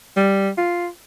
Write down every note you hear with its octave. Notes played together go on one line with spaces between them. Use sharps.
G3
F4